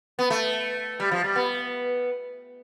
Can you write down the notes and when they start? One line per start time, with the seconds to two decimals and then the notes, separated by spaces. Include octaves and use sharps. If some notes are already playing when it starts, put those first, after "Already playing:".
0.19 B3
0.30 A3
1.00 G3
1.11 F3
1.24 G3
1.36 B3